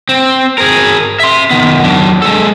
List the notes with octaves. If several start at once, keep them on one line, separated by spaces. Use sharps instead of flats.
C4
G#4 A#4
E5 C6
D#3 B3
F#3 D4
G#3 A4